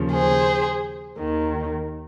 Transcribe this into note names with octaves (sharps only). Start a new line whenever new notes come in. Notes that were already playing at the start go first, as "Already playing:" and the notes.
Already playing: D#2 C#3 F3
G#4 C5
D#2 D#3